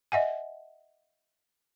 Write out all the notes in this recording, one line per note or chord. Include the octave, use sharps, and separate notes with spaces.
D#5 E5 F#5 G#5